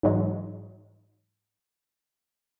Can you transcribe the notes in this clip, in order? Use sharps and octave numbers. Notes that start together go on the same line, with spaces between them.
G#2 E3 F#3 G#3